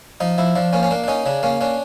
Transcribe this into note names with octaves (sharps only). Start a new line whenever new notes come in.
F3 D#4
F3 E4
F3 D4
A#3 C#4
C#4
A#3 D4
D4
C#4 D#4
C#3 D4
A#3 C#4
C#4 D4